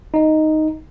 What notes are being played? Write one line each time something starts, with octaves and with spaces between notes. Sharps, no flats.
D#4 D#5